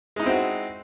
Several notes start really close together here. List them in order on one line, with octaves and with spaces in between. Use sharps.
G#3 D#4 E4 C4 F#4